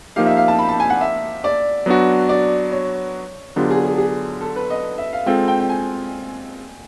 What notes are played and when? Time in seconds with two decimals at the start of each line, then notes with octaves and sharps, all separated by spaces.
0.16 F3 A#3 D#4 G4 F5
0.26 E5
0.37 F5
0.48 A5
0.59 B5
0.69 A5
0.80 G#5
0.90 F#5
1.01 E5
1.44 D5
1.86 F#3 B3 D4 F#4
2.29 D5
2.71 C#5
3.56 D3 F#3 B3 D4 F4 G4
3.71 G#4
3.85 G#4
3.98 G#4
4.41 A4
4.56 B4
4.70 D#5
4.98 E5
5.13 F5
5.26 G#3 C4 F4 A4 G5
5.48 G5
5.60 G5
5.69 G#5